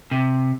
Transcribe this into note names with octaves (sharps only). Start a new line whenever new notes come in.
C3